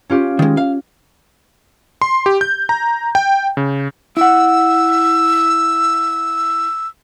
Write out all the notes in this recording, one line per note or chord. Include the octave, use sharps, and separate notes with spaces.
C#4 F4 G4
D#3 G#3
F5
C6
G4
G6
A#5
G5
C#3
E4 F#5 E6